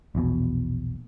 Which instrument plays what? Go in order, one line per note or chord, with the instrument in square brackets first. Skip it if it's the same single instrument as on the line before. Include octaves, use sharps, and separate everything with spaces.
[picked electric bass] A#1 E2 B2